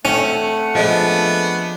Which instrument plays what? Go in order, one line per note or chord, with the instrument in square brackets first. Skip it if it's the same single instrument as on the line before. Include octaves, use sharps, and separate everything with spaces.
[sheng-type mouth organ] A3 F#5 [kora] C4 [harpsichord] C#4
[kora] F3 G#3 [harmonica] B3 D4